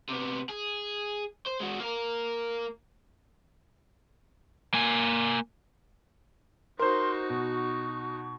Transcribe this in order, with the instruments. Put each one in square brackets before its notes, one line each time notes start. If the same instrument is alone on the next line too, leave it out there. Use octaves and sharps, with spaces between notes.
[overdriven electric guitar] C3 B3
G#4
C5
G#3 F#4
A#3 A#4
A#3 G#5
[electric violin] D#4 F#4 [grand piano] A#4 C5 [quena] C6
[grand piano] B2 [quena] C#6